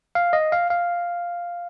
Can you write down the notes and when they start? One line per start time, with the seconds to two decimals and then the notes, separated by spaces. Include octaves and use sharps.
0.15 F5
0.33 D#5
0.52 F5
0.70 F5